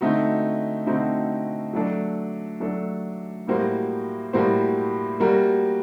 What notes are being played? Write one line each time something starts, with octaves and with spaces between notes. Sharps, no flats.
D3 A3 C4 D#4 F#4
D3 A3 C4 D#4 F#4
F#3 A3 D4 A4
F#3 A3 D4 A4
A2 G3 A#3 F#4 C5
A2 G3 A#3 F#4 C5
G3 A#3 F#4 A#4